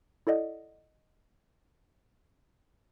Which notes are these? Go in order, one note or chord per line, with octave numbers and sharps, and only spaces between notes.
E4 A4 D5 D#5 F#5